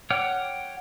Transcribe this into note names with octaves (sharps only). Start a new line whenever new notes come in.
C#5 F#5 G5 D6 F6